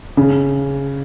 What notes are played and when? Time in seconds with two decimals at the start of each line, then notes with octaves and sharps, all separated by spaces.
0.17 C#3